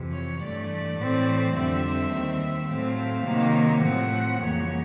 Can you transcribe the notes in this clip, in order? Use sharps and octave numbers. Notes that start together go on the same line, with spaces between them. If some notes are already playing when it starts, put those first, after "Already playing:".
Already playing: F2 C3 E3
C#5
G2 E3 A3 D5
A2 E3 A3 C4
F2 D3 G3 C4 E5
D#2 D#3 G3 C4
A2 F#3 A3 C4 F5
C3 D#3 F#3 A#3
A2 F3 A3 C4 F#5
F2 C#3 E3 G3 A#3 C#5